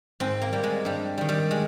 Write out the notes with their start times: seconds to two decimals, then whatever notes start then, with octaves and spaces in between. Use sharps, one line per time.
0.20 G#2 C4
0.42 A#3
0.53 G3
0.63 G#3
0.85 G2 G3
1.18 D#3 G3
1.29 G3
1.51 G#3